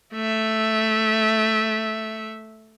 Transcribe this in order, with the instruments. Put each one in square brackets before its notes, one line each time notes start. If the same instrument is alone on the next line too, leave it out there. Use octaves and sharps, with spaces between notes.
[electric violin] A3 E5